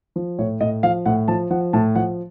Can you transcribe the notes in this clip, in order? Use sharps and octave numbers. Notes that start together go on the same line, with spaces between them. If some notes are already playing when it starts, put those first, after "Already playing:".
F3
A2 C#5
A2 D#5
F3 F5
A2 F#5
F3 A5
F3 F#5
A2 A5
F3 F#5